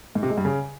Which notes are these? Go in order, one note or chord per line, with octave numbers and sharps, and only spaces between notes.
G#2
C3
G#3
G2
C#3